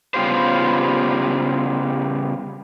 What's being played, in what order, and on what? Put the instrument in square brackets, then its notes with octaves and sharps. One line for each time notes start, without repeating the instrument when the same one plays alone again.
[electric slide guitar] C#3 G3 B3 F4 G4 C5